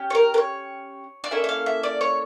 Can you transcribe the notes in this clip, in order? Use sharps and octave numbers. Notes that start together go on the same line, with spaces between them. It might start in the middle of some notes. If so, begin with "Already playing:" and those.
Already playing: C#4 G4
C#5
A#4
A#4
C#5
D5
A#3 C#4 E4 A4 E5
E5
F5
E5
D5
C#5